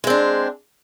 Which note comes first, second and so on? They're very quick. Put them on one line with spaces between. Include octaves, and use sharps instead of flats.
G#3 C4 D4